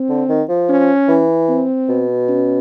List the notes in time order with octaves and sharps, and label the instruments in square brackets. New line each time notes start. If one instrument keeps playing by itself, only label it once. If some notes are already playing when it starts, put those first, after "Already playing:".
Already playing: [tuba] C4
[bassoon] D3
D#3
F3
[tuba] C#4
[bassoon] E3
[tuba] C4
[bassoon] B2
[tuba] C#4